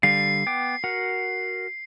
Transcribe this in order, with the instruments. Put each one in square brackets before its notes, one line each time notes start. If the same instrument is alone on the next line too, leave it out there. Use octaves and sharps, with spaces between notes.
[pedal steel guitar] D3 G3 F5 [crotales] C7
[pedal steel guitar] B3 G5 D6
F#4 A#4 F#5